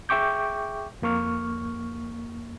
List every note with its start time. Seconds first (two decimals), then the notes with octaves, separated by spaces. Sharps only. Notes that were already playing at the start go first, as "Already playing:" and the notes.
0.09 G#4 E5 G5 C#6 D6 G6
1.02 F2 A#3 C#6 F6